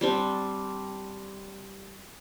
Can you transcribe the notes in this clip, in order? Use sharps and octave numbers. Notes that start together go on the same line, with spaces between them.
G3 C4 D4